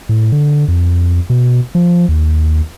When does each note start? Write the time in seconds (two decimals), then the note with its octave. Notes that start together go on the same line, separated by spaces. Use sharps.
0.09 A2
0.32 D3
0.68 F2
1.30 B2
1.75 F3
2.09 D#2